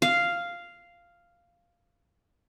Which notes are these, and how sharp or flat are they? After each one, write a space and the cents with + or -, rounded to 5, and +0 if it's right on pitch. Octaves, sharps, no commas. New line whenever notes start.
F5 -5